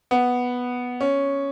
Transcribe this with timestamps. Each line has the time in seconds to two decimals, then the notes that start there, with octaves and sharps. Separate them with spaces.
0.11 B3
1.01 C#4